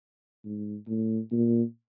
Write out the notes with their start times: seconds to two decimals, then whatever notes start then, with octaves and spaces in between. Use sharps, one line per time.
0.45 G#2
0.88 A2
1.32 A#2